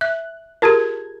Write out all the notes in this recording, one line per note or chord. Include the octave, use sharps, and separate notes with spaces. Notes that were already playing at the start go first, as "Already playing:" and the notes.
E5 F#6
F4 G4 G#4 A#4 A5 G#6